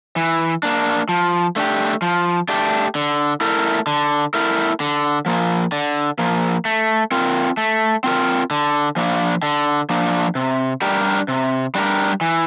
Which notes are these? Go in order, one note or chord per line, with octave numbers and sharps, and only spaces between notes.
E3
A#3 D4
F3
A3 D4 G4
F3
A3 D4 G4
D3
A3 E4 A#4
D3
A3 E4 A#4
D3
F3 A#3
D3
F3 A#3
A3
C4 F4 A#4
A3
C4 F4 A#4
D3
F3 A#3 D4
D3
F3 A#3 D4
C3
G3 D4 G4 A#4
C3
G3 D4 G4 A#4
E3